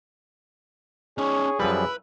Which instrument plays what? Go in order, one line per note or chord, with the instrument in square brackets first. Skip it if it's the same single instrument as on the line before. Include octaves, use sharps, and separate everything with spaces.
[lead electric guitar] C#4 D#4 [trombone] G#4 [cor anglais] C#5
[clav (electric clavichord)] F#2 F3 G3 [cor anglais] E4 [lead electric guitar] B4